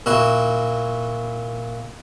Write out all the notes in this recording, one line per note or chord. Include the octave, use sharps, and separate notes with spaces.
A#2 E4 F#4